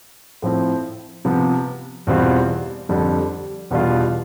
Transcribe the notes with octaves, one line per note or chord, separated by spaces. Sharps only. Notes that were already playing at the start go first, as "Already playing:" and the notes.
A2 F3 C4
C3 F3 B3
E2 B2 G3 C4 F4
F2 D3 G3
E2 B2 G3 D4 F4